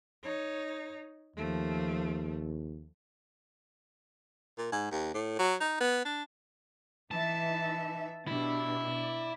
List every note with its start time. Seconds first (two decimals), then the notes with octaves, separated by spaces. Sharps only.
0.23 D#4 C#5
1.36 D#2 F3 A3
4.58 A#2
4.72 G#2
4.91 D#2
5.14 A2
5.39 F#3
5.60 D#4
5.80 B3
6.05 D4
7.11 E3 D#4 E5 A5
8.27 B2 D4 E4 G4
8.96 D5